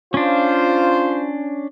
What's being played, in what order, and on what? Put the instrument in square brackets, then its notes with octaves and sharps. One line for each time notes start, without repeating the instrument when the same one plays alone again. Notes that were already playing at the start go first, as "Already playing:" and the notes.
[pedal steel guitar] C#4 D4 [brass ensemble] F4 C5